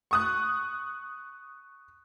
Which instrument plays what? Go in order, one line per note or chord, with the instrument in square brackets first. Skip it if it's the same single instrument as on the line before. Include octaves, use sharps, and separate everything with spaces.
[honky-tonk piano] C#6 D#6 F#6